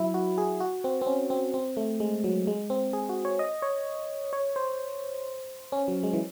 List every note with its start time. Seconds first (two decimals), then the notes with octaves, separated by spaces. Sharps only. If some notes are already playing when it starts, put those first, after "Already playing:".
Already playing: F#3 E4
0.14 F#4
0.38 G#4
0.60 F#4
0.84 C4
1.02 C4
1.07 C#4
1.30 C4
1.54 C4
1.77 A3
2.00 G#3
2.24 F#3
2.47 G#3
2.70 C4
2.93 G#4
3.09 F#4
3.25 C#5
3.39 D#5
3.62 C#5
4.33 C#5
4.56 C5
5.72 C#4
5.88 F#3
6.03 G#3
6.14 E3